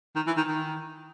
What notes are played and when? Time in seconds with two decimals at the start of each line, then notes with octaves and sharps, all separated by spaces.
0.16 D#3
0.26 E3
0.37 D#3
0.47 D#3